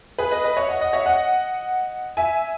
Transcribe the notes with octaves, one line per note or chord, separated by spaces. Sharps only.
G#4 B4
B4 D#5
B4 D#5
C#5 E5
D#5 F#5
D#5 F#5
C#5 E5
D#5 F#5
E5 G#5